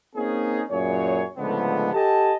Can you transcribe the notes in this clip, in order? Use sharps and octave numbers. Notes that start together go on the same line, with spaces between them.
A#3 C4 C#4 D#4 G#4
F#2 A#2 G#4 C#5
C#2 G#2 D3 F3 A3 B3
G4 A4 D#5 G#5 A5